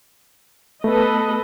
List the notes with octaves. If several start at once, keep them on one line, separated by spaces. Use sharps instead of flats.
A3 B3 A4 B4 D#5